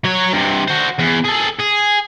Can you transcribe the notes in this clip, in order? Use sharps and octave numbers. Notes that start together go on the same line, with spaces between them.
F#3 C#5
G2 C3
F#4 C5
E2
G#4 A4
G#4